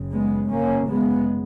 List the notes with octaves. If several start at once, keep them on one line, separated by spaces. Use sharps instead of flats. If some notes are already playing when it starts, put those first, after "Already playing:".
Already playing: F#1 F#2 C#3
G#3 B3
G#1 F#2 C#3 A#3 C#4
G#3 B3